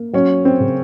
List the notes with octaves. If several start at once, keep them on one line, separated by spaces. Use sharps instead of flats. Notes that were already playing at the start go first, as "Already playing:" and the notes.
Already playing: A#3
F#3 C#4
C4
C#3